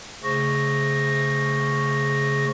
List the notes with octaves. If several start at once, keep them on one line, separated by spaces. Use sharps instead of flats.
C#3 A3 G#4 C5 C#6 A#6